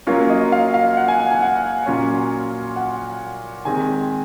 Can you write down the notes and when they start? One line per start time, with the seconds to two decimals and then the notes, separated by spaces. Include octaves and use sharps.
0.07 F#3 A#3 C#4 F4 C#5
0.30 D#5
0.52 F5
0.74 F5
0.97 F#5
1.08 G#5
1.20 F#5
1.31 G#5
1.42 F#5
1.86 A#2 F#3 C#4 F4 C#5
2.76 F#5
3.65 D#3 G#3 C4 G#5